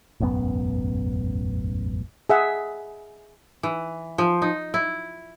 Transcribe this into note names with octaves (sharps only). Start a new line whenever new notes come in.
E1 A1 F#2 B3
G#4 E5 F#5
E3
F3
D#4
E4